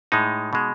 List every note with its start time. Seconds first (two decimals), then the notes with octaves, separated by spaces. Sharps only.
0.12 A2 G#3 D#4
0.53 B2 G#3